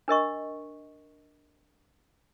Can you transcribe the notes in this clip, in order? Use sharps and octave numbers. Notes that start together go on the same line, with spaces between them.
D4 A#4 D#5 C#6